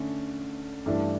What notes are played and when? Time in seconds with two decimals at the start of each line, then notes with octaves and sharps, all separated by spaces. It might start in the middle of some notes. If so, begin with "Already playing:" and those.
Already playing: D3 A3 C#4
0.86 G2 E3 A3 D4